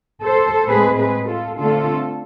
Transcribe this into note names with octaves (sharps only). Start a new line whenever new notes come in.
A4 C5
A2 G#3 C4 G#4 B4
G#4 B4
F4 A4
D3 A3 C4 F4 A4